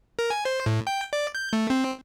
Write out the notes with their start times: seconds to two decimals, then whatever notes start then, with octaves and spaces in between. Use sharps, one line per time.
0.19 A#4
0.30 G#5
0.45 C5
0.66 A2
0.87 G5
1.13 D5
1.35 G6
1.53 A3
1.70 C4